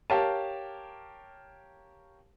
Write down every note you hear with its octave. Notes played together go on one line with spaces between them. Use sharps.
G4 A#4 C#5 F5 A5